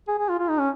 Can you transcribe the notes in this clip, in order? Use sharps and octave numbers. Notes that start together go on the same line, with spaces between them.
G#4
G#4
F4
F4
D#4
C#4